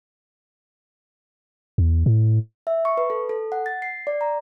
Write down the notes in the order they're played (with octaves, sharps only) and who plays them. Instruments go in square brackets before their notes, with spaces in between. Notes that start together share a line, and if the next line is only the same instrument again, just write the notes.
[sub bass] E2
A2
[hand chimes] E5
C#6
B4
A4
A4
F#5
A6
C7
D5
A#5